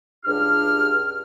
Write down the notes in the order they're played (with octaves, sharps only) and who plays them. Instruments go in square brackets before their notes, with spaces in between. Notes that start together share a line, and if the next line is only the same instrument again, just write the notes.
[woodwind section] C#2 G2 D4 G4 F6